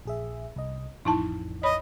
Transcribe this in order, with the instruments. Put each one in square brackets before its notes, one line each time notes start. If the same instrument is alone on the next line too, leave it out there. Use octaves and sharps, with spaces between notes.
[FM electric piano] A#1 G#4 E5
C2 D#5
[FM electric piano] A1 F2 [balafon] D#4 E4 A5
[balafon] C#5 B5 [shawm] D#5